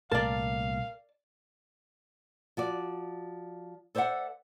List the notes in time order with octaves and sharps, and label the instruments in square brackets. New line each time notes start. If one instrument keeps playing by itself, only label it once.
[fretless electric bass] C2 A#2 A3 [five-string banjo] A#4 [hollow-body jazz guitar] D5 A5 [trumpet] F5
[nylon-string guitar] F3 F#4 D5
A4 C5 D5 E5 F#5